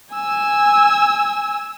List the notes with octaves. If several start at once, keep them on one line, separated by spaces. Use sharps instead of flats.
G#5 E6